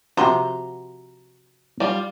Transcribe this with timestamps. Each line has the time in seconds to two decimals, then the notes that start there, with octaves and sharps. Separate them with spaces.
0.17 C3 F3 F#4 A#5 C6
1.80 G3 F4